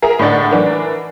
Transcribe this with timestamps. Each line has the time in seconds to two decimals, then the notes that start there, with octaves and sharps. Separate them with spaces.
0.02 G#4 A#4 E5 A#5
0.19 A2 D3 G#3 D4 F#5 A6
0.51 E3 D4 A#4